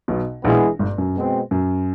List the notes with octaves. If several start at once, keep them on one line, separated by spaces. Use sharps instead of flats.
B1 B2
A#1 A#2 E3 G#3 B3 E4 G#4
G1 G2
F#2
B2 G#3 C4
F#2